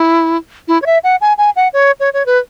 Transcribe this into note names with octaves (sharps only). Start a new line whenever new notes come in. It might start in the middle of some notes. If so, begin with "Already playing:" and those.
Already playing: E4
E4
C#5
E5
F#5
G#5
G#5
F#5
C#5
C#5
C#5
B4